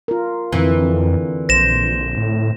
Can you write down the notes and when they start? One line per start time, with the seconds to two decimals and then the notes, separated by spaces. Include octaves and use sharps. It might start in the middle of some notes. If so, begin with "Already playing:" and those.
0.08 F4 A#4
0.52 F2 D3 E3 C4
1.49 A#1 C5 A#6 E7
2.17 A2